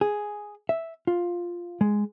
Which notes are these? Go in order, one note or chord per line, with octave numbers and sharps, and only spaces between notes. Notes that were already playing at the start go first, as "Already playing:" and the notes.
G#4
E5
F4
G#3